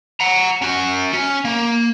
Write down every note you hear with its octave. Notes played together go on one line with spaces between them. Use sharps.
F#5 A#5
C#4 F#4
C#4
A#3